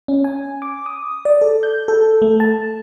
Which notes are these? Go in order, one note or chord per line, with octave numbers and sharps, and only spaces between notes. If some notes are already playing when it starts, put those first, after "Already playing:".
C#4
G#5
D6
D#6
D5
A4
G6
A4
A3
A5